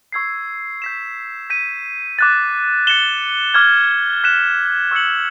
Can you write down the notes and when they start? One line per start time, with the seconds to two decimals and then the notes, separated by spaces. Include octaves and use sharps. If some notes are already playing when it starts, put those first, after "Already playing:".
0.12 C#6 E6 G#6 C7
0.82 G6 B6 E7
1.50 G6 B6 D#7
2.19 D6 F#6 A6
2.87 A6 C#7 E7 G7
3.54 D6 F6 G#6
4.24 F#6 B6 E7
4.91 C#6 E6 G#6 C#7 F#7